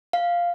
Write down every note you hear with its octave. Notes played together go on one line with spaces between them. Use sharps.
F5